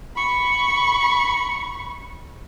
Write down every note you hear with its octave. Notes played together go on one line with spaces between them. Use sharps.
B5 C#6